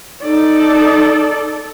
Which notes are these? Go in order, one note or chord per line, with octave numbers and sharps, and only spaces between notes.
D#4 A4 D5